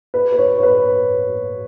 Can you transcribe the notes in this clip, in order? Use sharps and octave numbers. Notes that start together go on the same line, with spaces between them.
B4
B4
C#5
C#5
B4